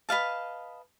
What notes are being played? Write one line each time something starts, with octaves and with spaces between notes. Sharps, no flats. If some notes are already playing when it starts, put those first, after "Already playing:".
B4 D#5 F5 A5